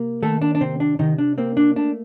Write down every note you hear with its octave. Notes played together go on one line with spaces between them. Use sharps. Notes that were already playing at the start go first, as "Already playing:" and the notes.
Already playing: C3 A#3
D#3 A3 A4
D4
D4
C3 C4
D4
C3 D#3 D#4
D4
A#3 C4
D4
A3 D4